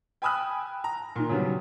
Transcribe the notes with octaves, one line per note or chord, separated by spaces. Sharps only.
G5 G#5 B5 D#6 E6 F#6
A#5
A#2 D#3
C#3 F#3 G3 B3